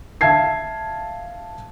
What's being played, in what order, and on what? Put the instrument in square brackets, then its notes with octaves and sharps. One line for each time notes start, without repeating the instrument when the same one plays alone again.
[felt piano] E5 F5 A5 G#6 C7